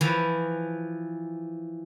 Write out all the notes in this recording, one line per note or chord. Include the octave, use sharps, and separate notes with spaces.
E3 F3